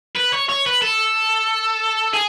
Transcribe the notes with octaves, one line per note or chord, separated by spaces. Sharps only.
B4
C#5
C#5
B4
A4
G#4